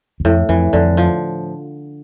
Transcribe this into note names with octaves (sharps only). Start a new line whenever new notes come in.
E2
F2 A2
F2 E3
F2 D3
F3